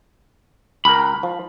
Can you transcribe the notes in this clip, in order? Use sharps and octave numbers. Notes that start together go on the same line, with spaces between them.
C#2 A#4 B5
F3